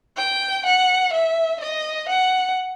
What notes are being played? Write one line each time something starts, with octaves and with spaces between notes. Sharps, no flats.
G5
F#5
E5
D#5
F#5